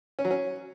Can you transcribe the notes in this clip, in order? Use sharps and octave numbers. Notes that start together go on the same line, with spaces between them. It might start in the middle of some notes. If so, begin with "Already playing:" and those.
C#4
F#3
C#4